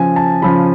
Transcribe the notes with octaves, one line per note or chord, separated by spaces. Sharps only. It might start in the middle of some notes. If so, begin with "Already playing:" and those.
Already playing: C#3 F3 G#5
A5
C#3 F3 B5